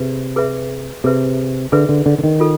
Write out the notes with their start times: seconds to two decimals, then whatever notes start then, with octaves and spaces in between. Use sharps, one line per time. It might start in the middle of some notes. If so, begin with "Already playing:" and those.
Already playing: C3 G#4 B4 E5
0.36 G#4 B4 E5
1.04 C3 G#4 B4 E5
1.72 D3 G#4 B4 E5
1.89 D3
2.06 D3
2.18 D3
2.24 D#3
2.40 F4 A4